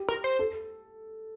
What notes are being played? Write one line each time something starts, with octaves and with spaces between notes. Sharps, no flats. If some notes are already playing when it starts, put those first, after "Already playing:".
Already playing: G4
A#4
C5
A4